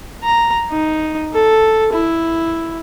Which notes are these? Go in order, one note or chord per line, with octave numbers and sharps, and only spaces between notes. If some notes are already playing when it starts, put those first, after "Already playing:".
A#5
D#4
A4
E4